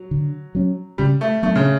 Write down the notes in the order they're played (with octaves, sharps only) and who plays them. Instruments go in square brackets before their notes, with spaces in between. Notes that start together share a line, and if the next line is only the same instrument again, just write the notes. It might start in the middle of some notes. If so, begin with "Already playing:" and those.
Already playing: [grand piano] F#3
[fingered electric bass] D3
F#3 C#4
[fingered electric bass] C#3 [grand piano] G3
[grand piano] A3
[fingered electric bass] F#3 B3 D4 [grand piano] A3
[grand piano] C#3